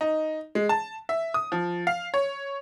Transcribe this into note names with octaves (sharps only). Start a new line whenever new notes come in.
D#4
G#3
A5
E5
D#6
F3
F5
C#5